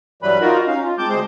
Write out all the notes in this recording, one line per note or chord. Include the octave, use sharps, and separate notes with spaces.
G2 E3 F#3 G3 B4 B5
D#4 F4 F#4 A#4
C#4 D#4 F5
F4
G#3 C4 A5 D6 G6
D2 G#3 G#4 C5 C6